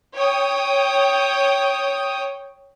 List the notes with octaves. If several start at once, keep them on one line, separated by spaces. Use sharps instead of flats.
C#5 G5 D#6